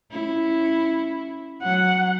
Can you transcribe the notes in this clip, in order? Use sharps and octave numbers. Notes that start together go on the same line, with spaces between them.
C#4 E4
F#3 F#5